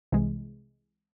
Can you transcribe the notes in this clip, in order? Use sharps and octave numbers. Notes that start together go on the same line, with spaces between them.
C2 C3 E3 G#3